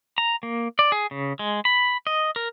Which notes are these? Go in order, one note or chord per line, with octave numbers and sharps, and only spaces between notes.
A#5
A#3
D5
G#4
C#3
G#3
B5
D#5
A#4